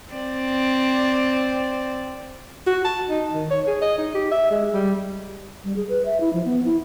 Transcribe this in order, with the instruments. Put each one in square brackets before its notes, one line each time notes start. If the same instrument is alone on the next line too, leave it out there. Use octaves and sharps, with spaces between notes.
[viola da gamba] C4 D5
[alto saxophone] F#4
A5
D#4
D#3
C#5
G#4
D#5
D#4
G4
E5
G#3
G3
[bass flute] G3
G#4
B4
E5
E4
F3
B3
E4